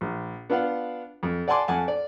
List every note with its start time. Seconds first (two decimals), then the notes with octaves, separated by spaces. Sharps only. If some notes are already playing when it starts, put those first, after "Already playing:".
0.01 A#1
0.49 B3 D4 F4 F5 F#5
1.23 F2
1.48 D5 F#5 G#5 A5 C6 D6
1.68 F2 F#5 G#5 A5
1.88 D5